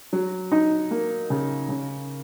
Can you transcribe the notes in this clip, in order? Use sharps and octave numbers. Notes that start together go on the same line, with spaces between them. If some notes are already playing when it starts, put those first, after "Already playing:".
F#3
D#4
A#3
C#3
C#3